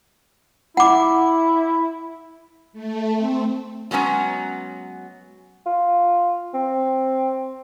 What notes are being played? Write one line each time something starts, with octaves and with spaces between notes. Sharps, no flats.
E4 F#5 D6
A3
C4
F#3 G#3 B3 C#4 A#5
F4
C4